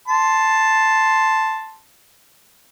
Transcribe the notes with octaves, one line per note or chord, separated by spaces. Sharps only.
A5 C6